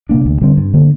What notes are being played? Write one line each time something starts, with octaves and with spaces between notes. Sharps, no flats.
C3 A#3 D4
D2
D3 G3 C4
G2
D3 A#3